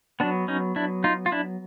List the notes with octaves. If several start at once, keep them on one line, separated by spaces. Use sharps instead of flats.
F#3 B3 D4
C#4 D#4
D4 E4
D#4 F4
F4
D4 E4